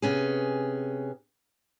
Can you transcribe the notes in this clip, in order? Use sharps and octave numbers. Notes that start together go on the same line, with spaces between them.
C3 B3 C#4 G#4